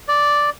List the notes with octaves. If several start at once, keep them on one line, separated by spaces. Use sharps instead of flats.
D5